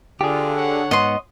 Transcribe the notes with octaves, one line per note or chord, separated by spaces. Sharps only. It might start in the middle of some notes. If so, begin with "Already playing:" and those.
D3 F4 G4 G#4
C#5 F#5
G#2 B3 D#5 C6